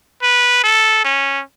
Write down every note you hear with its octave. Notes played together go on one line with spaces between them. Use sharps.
B4
A4
C#4